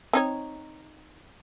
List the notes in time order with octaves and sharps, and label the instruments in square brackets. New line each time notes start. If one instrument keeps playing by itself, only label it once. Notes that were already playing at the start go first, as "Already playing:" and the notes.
[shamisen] C4 D#4 C#5